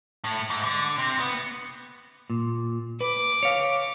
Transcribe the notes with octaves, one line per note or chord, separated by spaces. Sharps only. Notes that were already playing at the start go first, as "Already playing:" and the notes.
A2
G#2
D3
C3
B3
A#2
B4 D6
C#5 F5